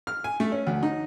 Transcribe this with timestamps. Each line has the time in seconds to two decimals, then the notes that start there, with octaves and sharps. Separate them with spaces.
0.07 F6
0.24 G#5
0.40 A3
0.52 C#4
0.67 D2
0.83 D#4